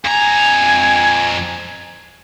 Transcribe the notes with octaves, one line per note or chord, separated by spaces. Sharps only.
F2 G#5 A#5